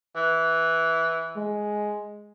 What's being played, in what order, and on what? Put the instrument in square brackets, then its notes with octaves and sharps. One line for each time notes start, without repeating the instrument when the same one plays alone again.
[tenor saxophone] E3
[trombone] G#3